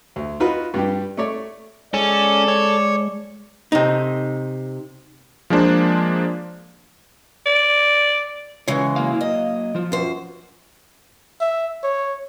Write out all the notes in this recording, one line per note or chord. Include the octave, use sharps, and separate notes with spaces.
D2
D#4 F4 F#4 B4
G2 G3 G4
A3 C#5 D5
G#3 C#4 A4 D5
C#5
C3 D#4
F3 G#3 A#3 D4 C5
D5
C#3 E3 G#3 C#5
F#3 A#3 F5
D#5
F3 F4
F#2 C5
E5
C#5